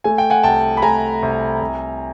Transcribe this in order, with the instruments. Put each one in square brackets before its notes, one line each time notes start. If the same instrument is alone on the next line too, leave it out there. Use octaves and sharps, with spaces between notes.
[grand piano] A3 G#5
G5
F#5 G#5
C2 G5 A5
B5
A3 G#5 A#5
C2
C2